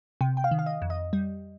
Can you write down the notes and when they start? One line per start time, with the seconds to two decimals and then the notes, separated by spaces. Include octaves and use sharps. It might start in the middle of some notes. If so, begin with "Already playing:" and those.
0.21 C3 G5
0.37 G5
0.44 F5
0.51 D#3
0.59 F5
0.66 D#5
0.82 F2
0.90 D#5
1.13 G3